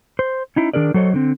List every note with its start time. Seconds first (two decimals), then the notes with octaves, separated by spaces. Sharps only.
0.19 C5
0.56 C#4 D#4 E4
0.73 D#3 D4 G#4 A#4 D5
0.94 F#3 A4 C5 C#5 D#5
1.13 D3 C4